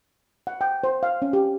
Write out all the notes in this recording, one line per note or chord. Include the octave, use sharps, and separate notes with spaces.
F#5
G5
C5
F5
C#4
G4